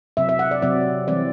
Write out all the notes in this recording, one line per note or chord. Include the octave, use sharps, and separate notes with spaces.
C3 F#3 C4 E5
E5
F#5
D5
C3 F#3 C4 D5
E3 G3 C4 D5